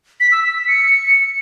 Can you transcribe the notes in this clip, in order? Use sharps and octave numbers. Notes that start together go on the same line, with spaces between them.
B6
E6
E6
B6
C#7